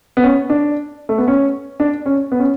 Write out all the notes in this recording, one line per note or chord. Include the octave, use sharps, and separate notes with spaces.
B3
C#4
D4
A3
B3
C#4
D4
C#4
B3
C#4